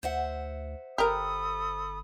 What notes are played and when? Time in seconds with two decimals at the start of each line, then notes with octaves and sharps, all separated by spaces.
0.03 D2 C5 E5 F#5
0.98 G1 G4 A4 A#4 B5 D#6